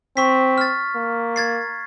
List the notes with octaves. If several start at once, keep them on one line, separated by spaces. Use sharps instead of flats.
C4 C#6 B6
F6 A6
A#3
G#6 A6 C7